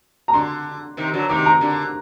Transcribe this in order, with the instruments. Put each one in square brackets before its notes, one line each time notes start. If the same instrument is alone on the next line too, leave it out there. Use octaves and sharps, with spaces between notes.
[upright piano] A#5
[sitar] D3 [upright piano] C6
[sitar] C3 D#3
D3 F#3
[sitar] C3 D#3 [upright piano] D6
[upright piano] A#5
[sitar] D3